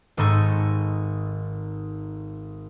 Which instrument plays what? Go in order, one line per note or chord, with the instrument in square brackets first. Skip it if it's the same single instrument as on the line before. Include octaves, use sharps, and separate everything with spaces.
[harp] G#1 G#2 D#4 A4 C#6